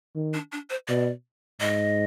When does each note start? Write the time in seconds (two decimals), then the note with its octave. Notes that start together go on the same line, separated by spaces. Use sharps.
0.15 D#3
0.34 D4
0.52 D4
0.70 C5
0.88 B2 D5
1.60 G#2 D#5